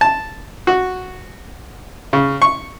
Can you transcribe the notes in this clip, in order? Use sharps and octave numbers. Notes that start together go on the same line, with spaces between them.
A5
F#4
C#3
C#6